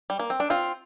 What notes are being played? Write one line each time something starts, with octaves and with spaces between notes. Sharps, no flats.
G3
A#3
C4
D4
C4 F4